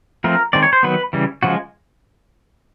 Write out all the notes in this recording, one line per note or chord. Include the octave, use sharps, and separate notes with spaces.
F3 A3 C4 A#4
D#3 G#3 C4 D5
C#5
C5
D#3 F#3 B3 B4
C#3 E3 G3
C#3 F3 G#3 F#4